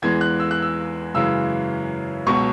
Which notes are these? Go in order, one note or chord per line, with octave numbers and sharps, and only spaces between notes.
E2 E3 G#3 G#6
F#6
E6
F#6
E6
F#2 C#3 E3 G#3 E6
C#2 B2 F#3 C#6